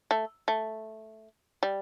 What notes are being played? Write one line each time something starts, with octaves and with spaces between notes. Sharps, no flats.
A3
A3
G3